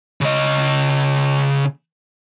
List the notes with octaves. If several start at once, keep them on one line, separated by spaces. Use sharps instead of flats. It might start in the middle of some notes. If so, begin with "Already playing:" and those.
C#3 D#5